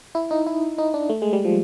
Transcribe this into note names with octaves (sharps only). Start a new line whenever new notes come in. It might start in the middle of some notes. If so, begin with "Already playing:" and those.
E4
D#4
E4
D#4
D4
A3
G#3
G3
F3